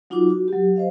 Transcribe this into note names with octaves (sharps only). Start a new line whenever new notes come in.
F#3 D#4 F4 F#4 D6
F#4
F#3 G4
C5 D#5 F5